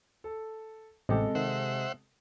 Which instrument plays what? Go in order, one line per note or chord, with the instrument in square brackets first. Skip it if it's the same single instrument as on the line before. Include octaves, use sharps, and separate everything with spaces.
[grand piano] A4
[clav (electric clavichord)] A1 G4 [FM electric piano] C3 [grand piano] G#3 A4
[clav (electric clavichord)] D#3 [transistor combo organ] C5 E5 F#5